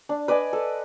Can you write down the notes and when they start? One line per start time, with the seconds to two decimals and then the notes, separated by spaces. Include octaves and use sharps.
0.09 D4
0.28 B4 D5 D#5 G#5
0.53 A4